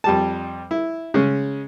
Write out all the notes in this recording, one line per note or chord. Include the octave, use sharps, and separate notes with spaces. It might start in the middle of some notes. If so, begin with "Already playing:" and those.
F2 G3 A5
E4
C#3 G#3 C#4